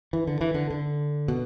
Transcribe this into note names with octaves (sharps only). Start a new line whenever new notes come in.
E3
D3
E3
D3
D3
B2